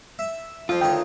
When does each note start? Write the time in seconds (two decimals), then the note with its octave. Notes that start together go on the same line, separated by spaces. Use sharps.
0.19 E5
0.69 F2 F3 F4
0.81 D2 D#3 C#5 G5